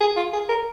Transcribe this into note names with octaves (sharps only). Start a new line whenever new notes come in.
G#4
F4
G#4
A#4